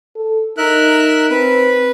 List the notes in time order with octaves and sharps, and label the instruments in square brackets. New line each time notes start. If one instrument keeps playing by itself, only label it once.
[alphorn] A4
[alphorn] D#4 [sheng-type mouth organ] A#4 E5 F#6
[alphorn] C4 [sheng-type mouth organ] B4